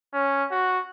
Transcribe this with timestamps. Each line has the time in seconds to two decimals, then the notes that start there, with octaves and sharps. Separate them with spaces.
0.14 C#4
0.51 F#4